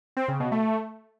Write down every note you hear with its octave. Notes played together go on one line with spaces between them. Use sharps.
C4
C#3
B2
A3